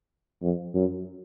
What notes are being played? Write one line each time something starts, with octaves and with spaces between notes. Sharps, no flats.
F2
F#2